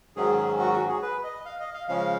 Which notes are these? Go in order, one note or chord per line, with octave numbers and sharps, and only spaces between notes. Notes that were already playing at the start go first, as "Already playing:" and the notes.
G#2 D#3 F#3 C#4 G#4
G#4
F#4
F#4
G#4
B4
D#5
F5
D#5
F5
C#3 F3 G#3 C#4 F5